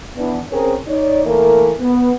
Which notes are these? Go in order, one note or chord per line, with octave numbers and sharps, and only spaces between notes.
E3 B3 D4
C4 C#4 G#4 A#4 C5 C#5
D#4 C#5 D5
E3 A3 A#3 A#4
B3